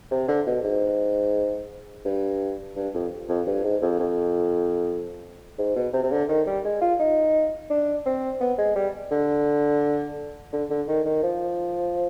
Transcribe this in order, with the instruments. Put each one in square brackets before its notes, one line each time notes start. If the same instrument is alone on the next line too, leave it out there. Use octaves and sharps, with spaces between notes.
[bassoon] C3
D3
B2
G#2
G2
G2
F2
F2
G2
G#2
F2
F2
G#2
B2
C3
C3
D3
D#3
G3
G#3
F4
D#4
D4
C4
B3
G#3
G3
D3
D3
D3
D#3
D#3
F3